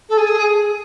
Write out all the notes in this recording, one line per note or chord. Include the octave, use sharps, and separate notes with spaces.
A4
G#4